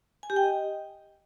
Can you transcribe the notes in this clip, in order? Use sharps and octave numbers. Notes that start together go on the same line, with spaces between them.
G#5
G4
G5
D#5